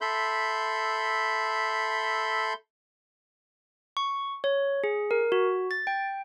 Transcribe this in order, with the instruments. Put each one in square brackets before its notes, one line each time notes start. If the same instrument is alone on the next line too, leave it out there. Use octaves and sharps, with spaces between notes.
[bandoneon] A4 E5 B5 C6 G6
[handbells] C#6
C#5
G#4
A#4
F#4
A6
G5